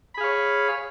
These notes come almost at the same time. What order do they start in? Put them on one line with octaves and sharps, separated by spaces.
B5 G#4 F5 C#5